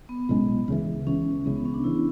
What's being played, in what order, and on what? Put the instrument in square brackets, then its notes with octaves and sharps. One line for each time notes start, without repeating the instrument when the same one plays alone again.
[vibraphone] B3
[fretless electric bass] B1 A2 G#3 C#4
C#2 C#3 E3
[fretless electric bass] C#2 C#3 E3 [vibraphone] C#4
[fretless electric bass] C#2 C#3 E3 [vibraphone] B3
[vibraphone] B3
C#4
D4
[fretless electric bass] C#3 E3 [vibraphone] E4